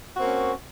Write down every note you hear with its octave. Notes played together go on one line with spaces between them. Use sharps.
A#3 C4 C#4 F#4